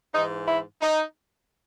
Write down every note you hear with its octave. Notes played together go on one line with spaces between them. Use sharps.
G#2 E3 D#4
E4
D#4